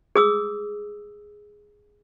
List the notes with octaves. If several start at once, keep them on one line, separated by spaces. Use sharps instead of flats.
G#4 D#6 E6